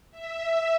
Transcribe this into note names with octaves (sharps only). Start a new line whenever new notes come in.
E5